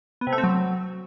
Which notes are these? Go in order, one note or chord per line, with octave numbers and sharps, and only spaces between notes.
B3
C3
A3
C4
F#3